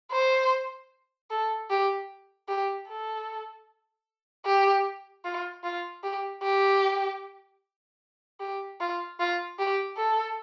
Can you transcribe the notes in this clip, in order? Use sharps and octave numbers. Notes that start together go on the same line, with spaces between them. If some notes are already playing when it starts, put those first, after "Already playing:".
C5
A4
G4
G4
A4
G4
F4
F4
G4
G4
G4
F4
F4
G4
A4